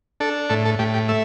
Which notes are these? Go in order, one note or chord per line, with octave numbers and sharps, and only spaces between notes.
D4 A4
A2 A4
A4
A2 G4
G4
A3 E5